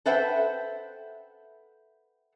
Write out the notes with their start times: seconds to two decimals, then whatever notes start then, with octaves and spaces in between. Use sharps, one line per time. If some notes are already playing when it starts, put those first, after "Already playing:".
0.06 A4 B4 C5 E5 F#5 G5